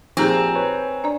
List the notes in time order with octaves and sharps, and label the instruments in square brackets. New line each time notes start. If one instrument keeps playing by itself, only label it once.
[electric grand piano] A#2 F3 [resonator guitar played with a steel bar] C4 [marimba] D#4 G4 G#4 [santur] G#5 A#5
[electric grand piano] B4 C#5
[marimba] D4 D5 [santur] A#5